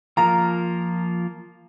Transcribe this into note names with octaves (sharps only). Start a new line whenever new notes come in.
F3 A#3 F4 A#4 A#5